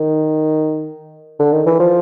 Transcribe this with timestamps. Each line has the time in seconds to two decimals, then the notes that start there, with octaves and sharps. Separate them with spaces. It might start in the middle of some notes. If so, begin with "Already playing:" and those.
Already playing: D#3
1.40 D3
1.52 D#3
1.66 E3
1.80 F3